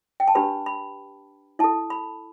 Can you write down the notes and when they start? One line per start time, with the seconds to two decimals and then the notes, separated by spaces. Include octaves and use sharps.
0.20 G5
0.28 A5
0.35 D4 G4 B4 B5
0.66 B5
1.59 E4 A4 A5
1.90 B5